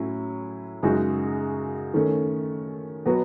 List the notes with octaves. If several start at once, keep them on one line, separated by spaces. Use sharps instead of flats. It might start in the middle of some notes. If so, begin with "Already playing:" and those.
Already playing: A2 F#3 C#4 E4
F#2 C#3 G#3 D#4 F#4
D#3 A3 C#4
B2 F#3 B3 F#4